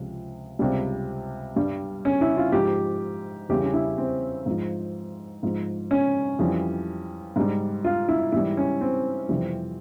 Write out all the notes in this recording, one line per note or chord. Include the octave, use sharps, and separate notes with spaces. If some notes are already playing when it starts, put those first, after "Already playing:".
Already playing: C#2 C3 F3
C#2 C3 G3
G2 G3
C#4
E4
F4
G#2 F3 G4
E2 C#3 E3 G3 G4
C#4
E4
C4
G#2 F3
G#2 F3
C#4
F2 E3 G3
G#2 G3
F4
E4
G#2 E3 G3 E4
C#4
C4
F2 C3 E3 G3